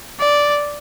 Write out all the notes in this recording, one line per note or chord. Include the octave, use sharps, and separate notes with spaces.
D5